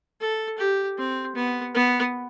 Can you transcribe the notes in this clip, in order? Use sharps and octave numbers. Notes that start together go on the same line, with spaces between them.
A4
G4
C4
B3
B3